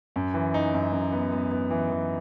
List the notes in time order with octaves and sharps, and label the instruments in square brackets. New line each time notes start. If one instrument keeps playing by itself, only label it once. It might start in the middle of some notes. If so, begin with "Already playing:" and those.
[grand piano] F#2
E3
D#4
F#2
F#2
B3
B3
B3
E3
E3